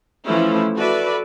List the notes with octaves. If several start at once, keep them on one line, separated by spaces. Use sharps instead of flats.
E3 F3 A3 C#4 E4
F#4 A4 B4 D5 E5